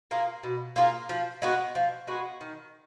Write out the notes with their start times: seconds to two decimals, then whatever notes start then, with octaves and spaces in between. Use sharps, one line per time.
0.11 A#3 F4 G#4
0.43 B2
0.76 A#3 F4 G#4
1.09 F3
1.42 G#3 B3 F#4
1.75 F3
2.07 G#3 B3 F#4
2.41 D#3